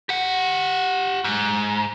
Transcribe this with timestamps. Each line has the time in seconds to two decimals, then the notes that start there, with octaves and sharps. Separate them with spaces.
0.09 G4 F#5
1.24 G#2